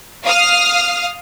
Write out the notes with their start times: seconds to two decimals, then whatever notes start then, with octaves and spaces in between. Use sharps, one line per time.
0.24 F5 D#6 F6